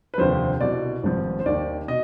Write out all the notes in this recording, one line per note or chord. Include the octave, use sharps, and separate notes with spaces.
B4
F1 D#2 D3 F3 C5
C2 B2 D5
G#1 G2 F3
C5
D#2 D#3 D5
B2 D#5